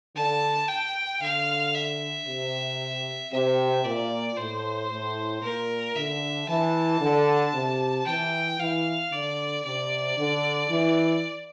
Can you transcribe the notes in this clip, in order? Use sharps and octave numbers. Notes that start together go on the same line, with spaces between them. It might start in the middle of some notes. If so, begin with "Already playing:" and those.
D3 A5
G5
D3 F5
E5
C3
C3 E5
A#2 D5
A2 C5
A2
A#2 A#4
D3 E5
E3 A5
D3
C3
E3 G5
E3 F5
D3 D5
C3 D5
D3
E3